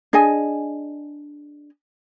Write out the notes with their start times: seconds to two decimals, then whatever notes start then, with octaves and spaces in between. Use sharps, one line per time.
0.13 D4 G#4 D#5 G#5